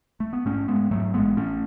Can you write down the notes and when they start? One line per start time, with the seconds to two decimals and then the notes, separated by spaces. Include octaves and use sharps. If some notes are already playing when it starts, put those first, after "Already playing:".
0.20 A3
0.33 B3
0.45 G#2 A3 C#4
0.68 G#2 G#3 B3
0.91 G#2 F#3 A3
1.14 A1 G#3 B3
1.37 A1 A3 C#4